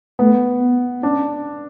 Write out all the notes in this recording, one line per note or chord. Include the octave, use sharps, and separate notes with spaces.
A3 B3
B3
C#4 D4